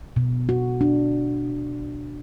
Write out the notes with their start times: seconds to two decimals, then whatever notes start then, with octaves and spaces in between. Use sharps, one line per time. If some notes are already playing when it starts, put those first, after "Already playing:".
0.16 B2
0.49 F#4
0.81 D4